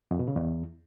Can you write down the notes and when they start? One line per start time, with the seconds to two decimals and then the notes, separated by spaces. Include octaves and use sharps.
0.11 F2
0.19 B2
0.28 C#3
0.36 E2